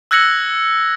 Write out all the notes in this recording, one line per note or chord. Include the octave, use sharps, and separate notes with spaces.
E6 F#6 G#6 A#6 C#7 F#7